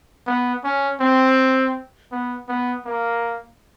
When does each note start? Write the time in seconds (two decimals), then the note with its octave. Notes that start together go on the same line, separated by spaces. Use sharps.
0.27 B3
0.64 C#4
1.00 C4
2.12 B3
2.48 B3
2.85 A#3